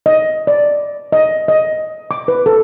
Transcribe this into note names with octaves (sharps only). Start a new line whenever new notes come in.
D#5
D5
D#5
D#5
D6
B4
A4